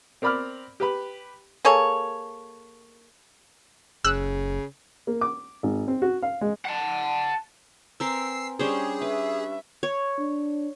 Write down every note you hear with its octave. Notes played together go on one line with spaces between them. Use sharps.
C4 A#4 D5 B5 D6 F6
G4 B4 B5
A#3 G#4 A4 C#5
F#1 C#3 E6 F#6
A#3
D6
G#1
C4
F#4
F5
G#3
F#5 A5
C4 A#4 B4 G#5 C6 E6 C7
G3 C#4 D4 G4 G#4 C5 C#6
B4 E5
C#5
D4